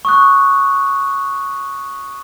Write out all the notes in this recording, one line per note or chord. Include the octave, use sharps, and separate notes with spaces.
C#6 D#6 F#6